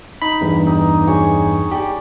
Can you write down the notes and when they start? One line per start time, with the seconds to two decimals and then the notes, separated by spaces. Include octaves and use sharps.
0.22 D#4 B5
0.41 E2 G2
0.66 D#4 G4
1.07 G#4 C#5 G#5
1.72 G4 D5